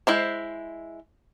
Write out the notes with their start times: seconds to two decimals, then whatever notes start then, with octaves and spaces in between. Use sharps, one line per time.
0.07 G#3 E4 C5